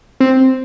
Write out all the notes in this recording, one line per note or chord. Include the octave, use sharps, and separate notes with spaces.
C4